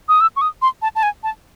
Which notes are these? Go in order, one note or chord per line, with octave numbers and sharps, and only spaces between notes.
D#6
E6
C#6
D#6
C6
A5
A5
G#5
A5